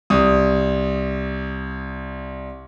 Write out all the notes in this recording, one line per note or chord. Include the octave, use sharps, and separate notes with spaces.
C2 D#6